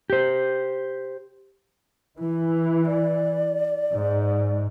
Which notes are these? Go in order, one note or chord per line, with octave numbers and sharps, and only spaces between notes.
G4 C5
E3 E4
D5
G#2